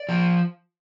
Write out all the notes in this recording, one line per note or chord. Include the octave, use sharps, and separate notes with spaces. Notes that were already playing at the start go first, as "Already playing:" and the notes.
Already playing: D5
F3